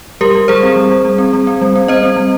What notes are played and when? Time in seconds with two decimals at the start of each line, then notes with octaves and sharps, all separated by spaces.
0.21 G3 G4 A#4
0.35 G3
0.48 G3 G#4 C5
0.63 C4
0.76 G3
0.91 G3
1.05 G3
1.18 C4
1.33 G3
1.47 C4
1.61 G3
1.76 C4
1.88 C4 C5 D#5
2.03 C4
2.16 G3